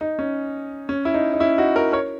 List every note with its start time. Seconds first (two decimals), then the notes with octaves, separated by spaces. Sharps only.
0.01 D#4
0.19 C#4
0.89 C#4
1.05 E4
1.14 D#4
1.33 D#4
1.40 C#4 E4
1.58 D#4 F#4
1.76 F#4 A#4
1.93 A#4 C#5